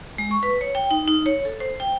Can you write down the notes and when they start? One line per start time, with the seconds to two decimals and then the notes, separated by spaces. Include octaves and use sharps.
0.18 G#3
0.31 C#6
0.43 B4
0.61 C#5
0.75 G5
0.91 D#4
1.08 D#4
1.26 C#5
1.45 A4
1.60 C5
1.80 G5